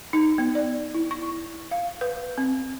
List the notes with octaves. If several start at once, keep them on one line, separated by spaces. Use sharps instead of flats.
D#4
B3
D5
E4
C#6
F5
B4
C4